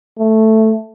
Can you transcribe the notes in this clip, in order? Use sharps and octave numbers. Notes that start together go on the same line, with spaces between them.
A3